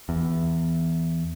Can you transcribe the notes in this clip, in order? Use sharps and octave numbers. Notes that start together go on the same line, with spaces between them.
E2